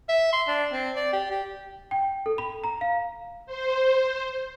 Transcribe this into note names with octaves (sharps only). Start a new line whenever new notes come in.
E5
C6
D4
C4
D5
G4
G4
G5
A4
B5
A#5
F5
C5